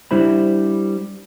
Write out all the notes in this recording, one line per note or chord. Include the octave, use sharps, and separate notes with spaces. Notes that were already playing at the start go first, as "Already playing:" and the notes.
G3 D4 E4 C5 B5